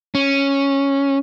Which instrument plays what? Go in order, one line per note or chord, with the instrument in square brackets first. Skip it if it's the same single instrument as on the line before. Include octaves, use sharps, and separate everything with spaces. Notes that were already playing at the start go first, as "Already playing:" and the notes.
[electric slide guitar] C#4